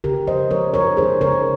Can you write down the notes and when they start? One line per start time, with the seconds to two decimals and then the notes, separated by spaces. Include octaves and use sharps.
0.04 C#3 G4 A#4
0.27 F3 C5 D#5
0.51 F3 A#4 C#5
0.74 D#4 A#4 C#5
0.97 D#4 G#4 C5
1.21 C#3 A#4 C#5